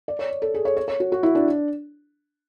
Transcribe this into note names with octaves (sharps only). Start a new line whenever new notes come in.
D5
C#5
A4
G#4
C#5
C#5
C#5
F#4
F#4
E4
D4